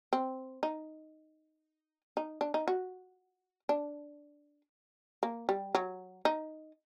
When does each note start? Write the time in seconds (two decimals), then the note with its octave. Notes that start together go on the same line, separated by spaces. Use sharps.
0.13 C4
0.63 D#4
2.17 D#4
2.41 D4
2.54 D#4
2.68 F#4
3.69 D4
5.23 A#3
5.49 G3
5.75 F#3
6.25 D#4